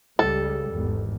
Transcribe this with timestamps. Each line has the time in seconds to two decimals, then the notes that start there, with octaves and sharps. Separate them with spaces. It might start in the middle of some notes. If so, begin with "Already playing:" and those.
0.19 C#2 C#3 G3 A4
0.70 G#1 E2